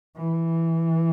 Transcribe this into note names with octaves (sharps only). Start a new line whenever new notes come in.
E3